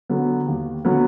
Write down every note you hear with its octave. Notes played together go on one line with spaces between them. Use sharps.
D3 F#3 B3
D#2
D3 F#3 B3